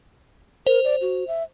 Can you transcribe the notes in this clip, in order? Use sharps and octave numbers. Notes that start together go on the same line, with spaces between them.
A#4 C5
D5
F#4
E5